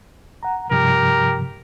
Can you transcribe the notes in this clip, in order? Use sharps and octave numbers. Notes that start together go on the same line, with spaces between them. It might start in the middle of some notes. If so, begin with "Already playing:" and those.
F#5 A#5
G2 C3 F3 G4 A#4